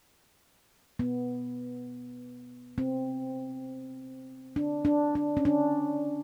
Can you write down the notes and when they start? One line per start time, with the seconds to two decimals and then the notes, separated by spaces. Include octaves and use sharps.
0.99 B3
2.78 C4
4.56 D4
4.85 D4
5.15 D4
5.37 C#4
5.45 D4